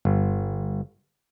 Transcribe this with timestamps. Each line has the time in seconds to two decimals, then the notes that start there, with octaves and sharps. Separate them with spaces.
0.05 G1